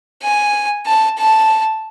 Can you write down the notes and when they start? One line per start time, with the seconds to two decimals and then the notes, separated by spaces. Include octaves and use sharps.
0.23 G#5
0.86 A5
1.18 A5